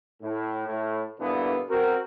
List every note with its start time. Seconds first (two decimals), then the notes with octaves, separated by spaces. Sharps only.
0.22 A2
0.67 A2
1.20 G2 A#2 D3 E3 B3 D4
1.69 C4 F#4 A#4